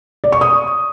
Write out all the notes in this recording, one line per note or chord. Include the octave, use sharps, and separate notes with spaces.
D5
C#6
D#6